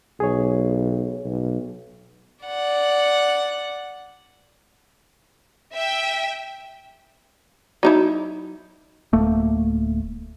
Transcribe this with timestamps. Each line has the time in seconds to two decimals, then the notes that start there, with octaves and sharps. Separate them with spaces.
0.20 B1 G#4 C#5
1.25 B1
2.45 D5 F#5
5.75 E5 G5
7.83 F#3 D#4 E4
9.13 D1 A3 A#3